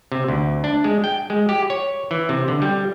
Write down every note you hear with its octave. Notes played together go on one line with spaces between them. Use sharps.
C3
D2
D4
G#3
G5
G#3
G4
C#5
E3
C3
D3
G3